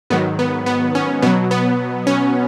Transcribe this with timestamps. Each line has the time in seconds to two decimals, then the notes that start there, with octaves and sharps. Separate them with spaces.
0.10 G#2 D#3 F#3 B3
0.39 B3
0.66 B3
0.95 C#4
1.22 B2 F#3 B3
1.51 B3
2.07 C#4